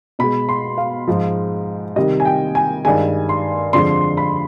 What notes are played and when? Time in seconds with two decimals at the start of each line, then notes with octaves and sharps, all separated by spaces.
0.19 B2 G#3 B5
0.49 C6
0.78 F5
1.08 G#2 F3 G#3
1.96 C3 D#3 G3 D#5
2.20 G#5
2.25 G5
2.55 G#5
2.85 G2 D#3 G#3 G#5
3.29 C6
3.73 F2 D3 F3 G#3 C6
4.17 B5